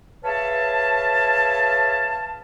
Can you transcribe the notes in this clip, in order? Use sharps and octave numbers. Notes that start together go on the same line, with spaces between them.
G#4 B4 C#5 E5 F5 A5